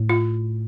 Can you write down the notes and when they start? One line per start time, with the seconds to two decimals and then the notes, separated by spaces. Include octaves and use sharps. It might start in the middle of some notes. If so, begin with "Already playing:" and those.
Already playing: A2
0.09 F4